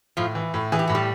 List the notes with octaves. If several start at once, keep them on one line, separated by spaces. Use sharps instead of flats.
A2 F3 F4
E3
A2
E3 G#4
G4
A2 F#4
G3 G4